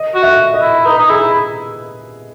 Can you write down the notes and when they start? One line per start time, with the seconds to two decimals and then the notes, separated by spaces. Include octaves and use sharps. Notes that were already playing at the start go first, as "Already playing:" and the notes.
Already playing: D#5
0.15 F#4
0.23 E5
0.54 D#5
0.62 E4
0.85 D#4 B4
0.98 D#4
1.09 E4 G#4